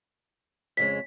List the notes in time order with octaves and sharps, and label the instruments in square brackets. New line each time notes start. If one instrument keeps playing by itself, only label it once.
[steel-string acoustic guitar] F2 C#3 G#3 [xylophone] B6